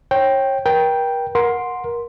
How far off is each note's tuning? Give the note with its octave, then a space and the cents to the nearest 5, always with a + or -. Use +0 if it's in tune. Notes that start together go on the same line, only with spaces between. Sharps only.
C#5 -30 G5 +0
A#4 +40 G5 +0
A#4 +20 F#5 -20 C6 +0